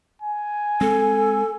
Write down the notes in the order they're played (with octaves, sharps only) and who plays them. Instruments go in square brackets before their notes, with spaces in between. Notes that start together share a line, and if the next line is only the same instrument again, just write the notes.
[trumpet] G#5
[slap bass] G#3 C4 [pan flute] A4